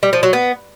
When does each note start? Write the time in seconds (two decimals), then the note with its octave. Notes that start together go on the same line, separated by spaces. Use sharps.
0.03 G3
0.13 F3
0.23 F#3
0.33 B3